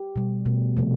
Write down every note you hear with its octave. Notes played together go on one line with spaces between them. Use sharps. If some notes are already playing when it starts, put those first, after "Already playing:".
Already playing: G4
B2 G3
B2 A3
C3 F3 A3